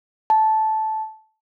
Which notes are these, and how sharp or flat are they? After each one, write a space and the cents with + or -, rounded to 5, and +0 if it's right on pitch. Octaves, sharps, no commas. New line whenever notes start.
A5 -10